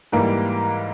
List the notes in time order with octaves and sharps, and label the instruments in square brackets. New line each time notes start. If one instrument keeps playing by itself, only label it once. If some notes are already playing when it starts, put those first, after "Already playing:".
[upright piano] G#2 E3 G3 [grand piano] A#3